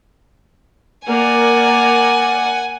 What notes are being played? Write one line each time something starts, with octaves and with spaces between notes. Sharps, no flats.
A#3 A#4 D5 F#5 G#5